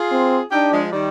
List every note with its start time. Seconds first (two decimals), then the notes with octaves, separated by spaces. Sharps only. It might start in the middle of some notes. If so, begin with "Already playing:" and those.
Already playing: F4 G#4
0.12 C4
0.52 D4 D#4 G4
0.72 F3 G#3
0.93 D#3 G3